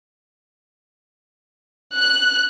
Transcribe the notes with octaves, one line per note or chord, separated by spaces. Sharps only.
F#6